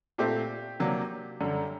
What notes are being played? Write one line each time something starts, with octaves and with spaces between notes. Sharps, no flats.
A#2 A3 C4 G4
C3 F#3 A#3 D4
F#2 D3 G3